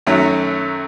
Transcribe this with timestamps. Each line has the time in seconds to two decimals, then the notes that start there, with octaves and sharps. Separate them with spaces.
0.07 F#2 D#3 F#3 A3 C#4